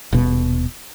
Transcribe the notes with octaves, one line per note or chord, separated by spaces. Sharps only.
D#1 B2